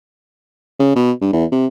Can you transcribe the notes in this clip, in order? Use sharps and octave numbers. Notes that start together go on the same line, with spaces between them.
C#3
B2
G2
E2
C3